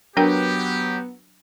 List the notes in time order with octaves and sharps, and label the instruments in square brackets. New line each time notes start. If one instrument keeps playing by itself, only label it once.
[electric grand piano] F#3 [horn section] B3 [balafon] D4 A#4 G5 [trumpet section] G4